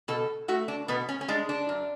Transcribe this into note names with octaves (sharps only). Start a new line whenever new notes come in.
B2 A4
A3 F#4
D4
B2 B3
C#4
C#4
G#3 D4
D4
F#2